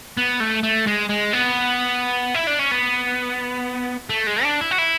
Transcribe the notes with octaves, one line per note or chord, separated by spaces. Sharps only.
B3
A3
A3
G#3
G#3
B3
E4
D4
C#4
B3
A3
G#3
D4
E4
F#4
E4